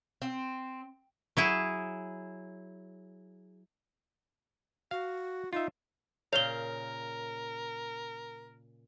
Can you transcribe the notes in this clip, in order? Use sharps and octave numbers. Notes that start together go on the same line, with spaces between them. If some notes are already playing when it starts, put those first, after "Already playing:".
C4
F#3 E4 G#4
F#4 F5
D#4 F4 E5
A#2 C#3 A#4 C#5 F5 F7 G7